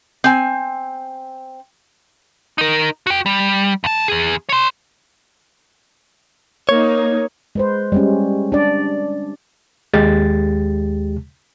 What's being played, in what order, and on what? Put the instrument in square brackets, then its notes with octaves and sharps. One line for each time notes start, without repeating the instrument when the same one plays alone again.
[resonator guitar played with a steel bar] C4 G#5
[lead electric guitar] D#4 A#4
F#4 G5
G3
D#2 A5
E2 G#4
C#5 C6
[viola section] A#3 D#4 [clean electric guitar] C#5
[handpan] G#3 B4 C5
G3 G#3 C#4
D4 D5
[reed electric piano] D#2 G#3 G4 A6